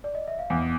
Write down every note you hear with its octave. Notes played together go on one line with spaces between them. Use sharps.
D5
D#5
E5
F5
E2 F#5